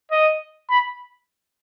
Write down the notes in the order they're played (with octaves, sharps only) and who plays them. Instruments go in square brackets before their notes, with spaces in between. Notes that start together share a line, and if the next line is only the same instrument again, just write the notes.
[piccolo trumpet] D#5
B5